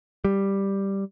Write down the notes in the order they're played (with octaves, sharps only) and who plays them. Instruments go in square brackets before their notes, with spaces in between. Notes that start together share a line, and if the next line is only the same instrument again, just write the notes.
[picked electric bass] G3